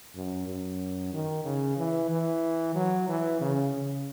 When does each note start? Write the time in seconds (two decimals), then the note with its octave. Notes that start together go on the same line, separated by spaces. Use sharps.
0.15 F#2
0.47 F#2
1.13 D#3
1.44 C#3
1.77 E3
2.10 E3
2.75 F#3
3.08 E3
3.41 C#3
3.73 C#3